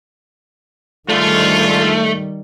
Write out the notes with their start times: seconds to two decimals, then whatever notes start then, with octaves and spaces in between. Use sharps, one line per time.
1.09 G#2 D3 D#3 G3 A3 F4